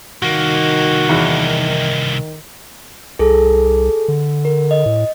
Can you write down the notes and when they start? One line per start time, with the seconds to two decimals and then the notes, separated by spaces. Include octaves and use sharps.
0.22 C2 D#3 A#3 F#4
1.09 E2
3.19 C2 G#4 A4
4.08 D3
4.45 A#4
4.71 D#5
4.86 A2